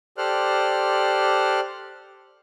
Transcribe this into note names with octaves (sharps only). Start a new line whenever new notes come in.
G4 A4 C5 D5 F6 F#6